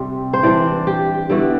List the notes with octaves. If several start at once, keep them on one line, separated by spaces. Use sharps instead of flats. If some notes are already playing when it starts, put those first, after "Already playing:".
Already playing: C3 G3 C4
C5
E3 G3 D4 D5
G4
D3 G3 B3 E4 F#4